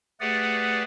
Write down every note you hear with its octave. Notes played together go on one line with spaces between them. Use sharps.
A3 G4 G#4 B4 D5 F#5